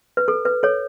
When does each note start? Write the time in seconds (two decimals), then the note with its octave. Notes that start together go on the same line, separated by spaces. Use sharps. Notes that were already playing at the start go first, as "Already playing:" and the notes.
0.17 B4
0.28 A4
0.45 B4
0.63 A4 C#5